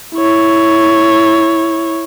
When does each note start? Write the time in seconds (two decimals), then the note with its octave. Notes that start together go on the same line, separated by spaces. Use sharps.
0.15 E4 C#5